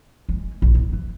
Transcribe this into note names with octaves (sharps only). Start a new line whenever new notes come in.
G#3
A#1
D#2
E3